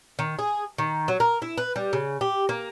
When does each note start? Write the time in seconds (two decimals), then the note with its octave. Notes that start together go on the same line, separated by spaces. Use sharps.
0.19 D#3
0.39 G#4
0.78 D#3
1.08 F#3
1.20 A#4
1.42 E4
1.58 B4
1.76 G3
1.93 C#3
2.21 G4
2.49 A#3